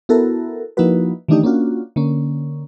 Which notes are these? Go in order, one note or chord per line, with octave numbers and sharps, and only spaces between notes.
B3 E4 F#4 A4 A#4
F3 A#3 D#4 E4 F#4 B4
D#3 E3 A3 D4 D#4 G4
A#3 C#4 D4 F4 F#4
D3 A#3 C#4